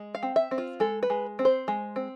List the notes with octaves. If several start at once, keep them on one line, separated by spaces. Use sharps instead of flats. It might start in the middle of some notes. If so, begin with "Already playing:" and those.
Already playing: G#3
F5
C4
E5
C4
F4
G#3 A4
B4
G#3
C4
C5
G#3
C4